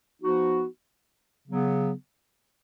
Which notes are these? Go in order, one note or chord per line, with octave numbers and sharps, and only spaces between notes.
F3 B3 D#4 F#4
C#3 F#3 B3